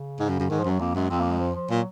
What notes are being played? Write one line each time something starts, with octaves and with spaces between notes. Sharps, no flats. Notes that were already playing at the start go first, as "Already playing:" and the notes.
Already playing: C#3
G#2
F#2
F#2
G#2 D#3
F3
F#2
F#3
F2 A#3
F#2 G#3
F2 C4
A#3
G#3
F3
F3
A#2 F#3